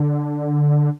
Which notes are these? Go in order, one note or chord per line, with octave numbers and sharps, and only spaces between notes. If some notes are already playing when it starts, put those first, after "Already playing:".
Already playing: D3